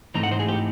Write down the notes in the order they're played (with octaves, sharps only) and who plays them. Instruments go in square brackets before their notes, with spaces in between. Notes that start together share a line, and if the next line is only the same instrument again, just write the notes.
[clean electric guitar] G#2 E3 A3 C4 D#4 A#5
F#5
C5
G#4
G4